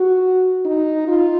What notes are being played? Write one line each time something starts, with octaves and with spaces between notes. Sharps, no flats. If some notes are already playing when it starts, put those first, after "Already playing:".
Already playing: F#4
D#4
F4